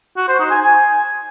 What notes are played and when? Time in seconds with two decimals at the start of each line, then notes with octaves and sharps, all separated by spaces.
0.17 F#4
0.28 C5
0.39 D#4
0.51 G#5
0.62 G#5